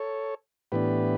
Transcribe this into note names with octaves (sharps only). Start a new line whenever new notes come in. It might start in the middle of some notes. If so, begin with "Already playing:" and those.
Already playing: A4 C#5
A2 E3 B3 D4 G4 B4